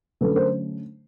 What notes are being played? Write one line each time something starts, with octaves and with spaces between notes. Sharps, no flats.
D3 F#3 A3 C#4 A4 B4
A#4 C5